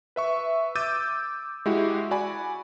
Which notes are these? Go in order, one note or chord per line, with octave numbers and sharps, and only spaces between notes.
B4 E5 C#6
D6 E6 G6 A6 D#7
G#3 E4 F#4 G4
F#4 D5 G#5 B5